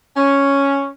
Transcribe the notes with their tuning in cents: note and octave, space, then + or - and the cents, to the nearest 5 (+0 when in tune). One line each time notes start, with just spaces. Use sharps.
C#4 +0